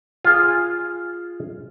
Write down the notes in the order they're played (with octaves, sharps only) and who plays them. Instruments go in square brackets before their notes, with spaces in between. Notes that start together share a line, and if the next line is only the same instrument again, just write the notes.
[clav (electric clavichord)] F4 G#4